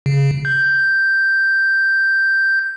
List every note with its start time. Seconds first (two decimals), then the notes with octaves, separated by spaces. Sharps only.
0.06 C#3
0.45 G6